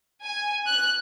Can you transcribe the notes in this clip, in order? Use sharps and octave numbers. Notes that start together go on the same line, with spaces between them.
G#5
F#6